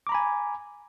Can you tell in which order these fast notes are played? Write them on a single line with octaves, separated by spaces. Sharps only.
D6 A#5 B5 G#5